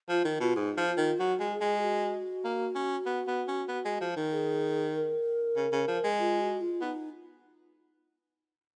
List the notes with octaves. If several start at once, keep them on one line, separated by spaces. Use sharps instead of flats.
F3 F4
D#3 D#4
B2 F4
G#2 D#4
F3
F4
D#3
F#3 F#4
G#3
G#4
G#3
F#4
A#3
C#4
B3
B3
C#4
B3
G#3
F3
D#3
G#4
A#4
C#3
C#3
F3
G#3
F4
F#4
F4
B3 D#4